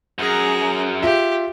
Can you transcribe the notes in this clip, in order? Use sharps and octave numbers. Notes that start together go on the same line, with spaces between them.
F#2 G#4 A#5
F4 G4 E5